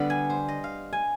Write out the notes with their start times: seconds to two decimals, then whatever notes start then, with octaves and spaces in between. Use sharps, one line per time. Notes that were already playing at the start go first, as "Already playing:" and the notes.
Already playing: D3 G3 B3 B5
0.10 G#5
0.30 C5
0.48 D#5
0.64 F5
0.93 G#5